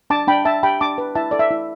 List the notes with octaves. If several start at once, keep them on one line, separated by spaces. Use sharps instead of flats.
D4 A5 D6
D4 G5 B5
D4 E5 A5
G4 G5 B5
D4 A5 D6
B4
E4 E5 A5
A4 D5
E5
E4